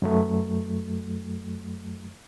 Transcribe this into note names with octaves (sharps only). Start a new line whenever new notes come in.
F#2 F#3 A3